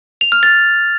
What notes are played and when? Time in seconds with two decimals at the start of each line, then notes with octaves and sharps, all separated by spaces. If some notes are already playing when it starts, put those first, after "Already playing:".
0.21 F7
0.32 F6
0.43 A6